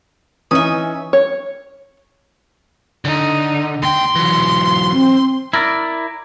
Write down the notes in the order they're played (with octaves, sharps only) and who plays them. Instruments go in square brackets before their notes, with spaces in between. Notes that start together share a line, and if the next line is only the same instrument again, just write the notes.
[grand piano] E3 C#4 D#4 [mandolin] E5 D#6
[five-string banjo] C#5
[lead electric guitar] D3 [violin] D#4
[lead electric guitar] D#2 G5 [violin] C6
[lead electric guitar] E3 F#3
[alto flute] C4
[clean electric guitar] E4 A#4 D5